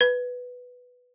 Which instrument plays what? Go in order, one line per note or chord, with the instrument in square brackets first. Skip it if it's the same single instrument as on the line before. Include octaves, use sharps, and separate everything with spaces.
[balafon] B4